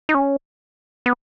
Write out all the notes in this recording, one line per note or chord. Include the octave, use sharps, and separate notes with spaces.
D#4
C#4
B3